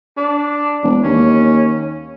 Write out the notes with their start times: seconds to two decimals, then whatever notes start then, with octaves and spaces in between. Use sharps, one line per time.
0.17 D4
0.82 E1
1.03 D#2 C#4